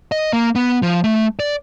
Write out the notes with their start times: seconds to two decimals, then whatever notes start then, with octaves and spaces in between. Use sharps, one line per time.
0.12 D#5
0.33 A#3
0.55 B3
0.82 F3
1.04 A3
1.39 D5